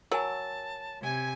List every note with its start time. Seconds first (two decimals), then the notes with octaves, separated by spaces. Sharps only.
0.12 F#3 A#4 G#5 A5
1.02 C3 G#5 G#6